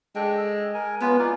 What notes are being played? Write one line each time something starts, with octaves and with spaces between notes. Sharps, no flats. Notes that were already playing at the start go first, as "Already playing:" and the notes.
G#3 D4 A4 G5
E6
A#4 G#5
B3 C#4 F4 B4
D#4 F4 D5